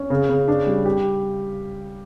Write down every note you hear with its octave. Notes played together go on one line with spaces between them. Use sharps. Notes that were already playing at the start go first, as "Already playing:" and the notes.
Already playing: C#4
C#3
C#3
D4
G3
G4